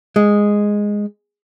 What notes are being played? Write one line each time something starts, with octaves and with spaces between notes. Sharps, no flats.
G#3